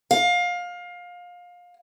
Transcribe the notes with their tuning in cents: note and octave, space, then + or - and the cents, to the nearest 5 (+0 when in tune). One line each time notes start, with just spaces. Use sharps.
F5 +25